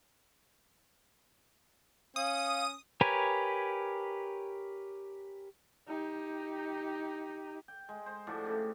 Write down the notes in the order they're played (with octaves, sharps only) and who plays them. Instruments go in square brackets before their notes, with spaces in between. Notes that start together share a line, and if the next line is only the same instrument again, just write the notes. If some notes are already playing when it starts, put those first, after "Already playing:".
[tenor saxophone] C#4 [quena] F5 [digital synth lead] D#6
[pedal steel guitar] G4 A#4 B4 C#5 G#5
[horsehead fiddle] D#4 G4
[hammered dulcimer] G5
G#3
C5
A2 F3 D4 F#4
C#3 A3 G4